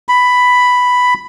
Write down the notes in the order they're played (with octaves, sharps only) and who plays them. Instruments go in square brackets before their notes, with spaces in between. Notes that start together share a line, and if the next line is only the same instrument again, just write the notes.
[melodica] B5